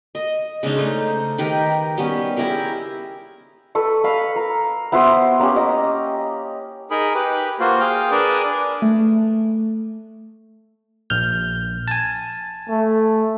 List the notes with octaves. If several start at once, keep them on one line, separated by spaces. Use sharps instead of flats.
D#5
C#3 G#3 D4 D#4
A3 D#4 C5
D#3 G4 A#4 B4
G3 B3 C#4
E4 G4 G#4 A#4
A4 B4 C#6
B4 F5 B5
A#4
B3 E4 F#4 C5
A#3 C#4 G4
D#5
D#4 G#4 A#4 B5
G4 B4
A#3 F4 F#4 C5
G#4 F5 G5 F6
D4 G#4 A#4 B4 D5
A3
A#1 F6 G6
G#5 A5
A3